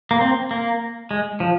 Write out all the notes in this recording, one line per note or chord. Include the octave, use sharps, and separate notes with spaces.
A#3
C4
A#3
G#3
F3